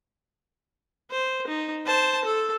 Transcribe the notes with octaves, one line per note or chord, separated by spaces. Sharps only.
C5
D#4
C5 A5
A4